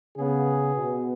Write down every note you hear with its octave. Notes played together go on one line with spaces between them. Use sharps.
C#3 B3 G#4
B2 B3